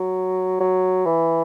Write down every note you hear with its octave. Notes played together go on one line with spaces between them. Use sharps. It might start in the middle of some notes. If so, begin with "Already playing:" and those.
Already playing: F#3
F#3
E3